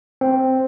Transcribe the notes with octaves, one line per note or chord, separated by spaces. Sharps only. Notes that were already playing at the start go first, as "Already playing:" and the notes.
C4